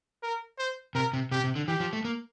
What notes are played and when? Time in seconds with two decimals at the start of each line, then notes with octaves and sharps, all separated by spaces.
0.23 A#4
0.59 C5
0.95 C3 A#4
1.13 C3
1.31 C3 G4
1.44 C3
1.55 D3
1.68 E3 G4
1.80 F3
1.93 A3
2.05 A#3